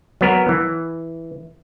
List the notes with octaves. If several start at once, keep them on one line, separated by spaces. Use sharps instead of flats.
F#3 B3 A#4
E3